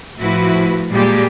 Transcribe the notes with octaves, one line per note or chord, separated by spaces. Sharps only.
A2 F3 E4 F#4 B4
A#2 G3 G#3 A#3 G4 G#4